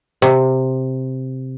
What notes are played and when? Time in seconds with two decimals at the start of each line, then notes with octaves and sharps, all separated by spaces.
0.22 C3